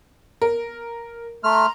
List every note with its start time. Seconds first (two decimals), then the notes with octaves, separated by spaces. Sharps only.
0.42 A#4
1.44 A3 A#5 C6 F6